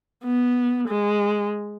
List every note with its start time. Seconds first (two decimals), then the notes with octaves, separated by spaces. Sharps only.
0.24 B3
0.88 G#3